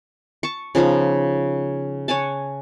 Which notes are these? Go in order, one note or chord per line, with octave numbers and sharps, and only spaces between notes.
A5 C#6
C#3 F3 B3 D#4
C#5 F#5 G#5 A5